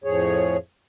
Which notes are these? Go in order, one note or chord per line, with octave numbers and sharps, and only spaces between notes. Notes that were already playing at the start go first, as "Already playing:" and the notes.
F2 A2 F3 G#4 C#5